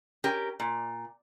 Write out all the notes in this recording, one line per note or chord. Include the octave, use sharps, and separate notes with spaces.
C#4 G4 A#4
A#2